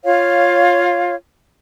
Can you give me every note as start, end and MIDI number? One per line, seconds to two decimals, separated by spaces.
0.04 1.15 65
0.04 1.15 73
0.04 1.15 77